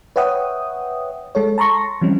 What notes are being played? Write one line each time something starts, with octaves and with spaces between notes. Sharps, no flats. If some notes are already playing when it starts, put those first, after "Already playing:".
B4 C#5 E5 F#5 G5 D#6
G#3 A4 C#5
A5 A#5 C6 C#6 A#6
E3 F3 G3 C4 C#4